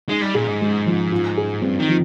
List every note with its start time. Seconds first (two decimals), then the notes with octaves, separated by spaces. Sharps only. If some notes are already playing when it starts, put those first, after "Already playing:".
0.09 G#3 D#4
0.22 G3
0.35 A#2 G#4
0.48 G#2
0.61 G#3
0.86 F3
1.12 F4
1.37 G#4
1.62 G2 C4
1.79 D#3
1.89 F3